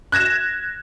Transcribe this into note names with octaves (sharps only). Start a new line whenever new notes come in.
F#6 G#6 A#6 E7